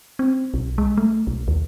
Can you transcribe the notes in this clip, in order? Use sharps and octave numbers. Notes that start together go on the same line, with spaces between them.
C4
B1
G#3
A3
B1
D#2